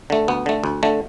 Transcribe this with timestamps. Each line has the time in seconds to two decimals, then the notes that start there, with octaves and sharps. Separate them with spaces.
0.10 D3 A3
0.28 D2 B3
0.46 D3 A3
0.64 D2
0.83 D3 A3